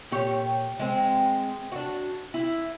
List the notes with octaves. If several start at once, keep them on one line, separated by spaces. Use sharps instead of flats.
A#2 G4 C#5
G#3 C4
D4 F#4
E4